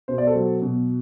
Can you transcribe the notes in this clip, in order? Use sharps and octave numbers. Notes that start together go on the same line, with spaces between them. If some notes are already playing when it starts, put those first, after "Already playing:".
B2 C5
D5
A4 C5
F#3
B2